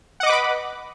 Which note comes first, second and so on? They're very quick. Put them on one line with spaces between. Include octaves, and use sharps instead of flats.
F#5 D#5 D6 B4 B5